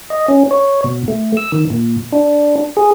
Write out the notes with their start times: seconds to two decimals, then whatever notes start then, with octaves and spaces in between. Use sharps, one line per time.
0.10 D#5
0.28 C#4
0.51 C#5
0.84 B2
1.08 A3
1.37 E6
1.52 D#3
1.70 A#2
2.12 D4
2.77 G#4